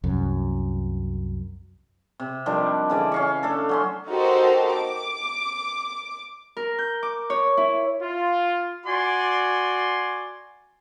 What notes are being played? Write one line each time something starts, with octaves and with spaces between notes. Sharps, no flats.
C2 F#2
C3
D#3 F3 G3 D4
C#3 E3 D5
C#4 F5 C#6
A3 D4 A4
F#3 C#4 C6
D#4 F#4 G4 A4 A#4 C5
D6
A#4
G6
D6
C#5
E4
F4
F#4 D5 G#5 C6